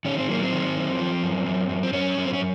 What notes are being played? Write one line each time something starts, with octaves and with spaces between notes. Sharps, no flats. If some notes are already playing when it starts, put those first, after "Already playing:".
D#3 C#4
C4
F#3 A#3
C4
D#3
F#2
F3
F#2
F#2
F#2
C4
F#2 C#4
F#2
C4
C#4